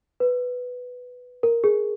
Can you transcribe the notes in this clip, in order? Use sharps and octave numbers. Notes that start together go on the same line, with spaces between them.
B4
A#4
G#4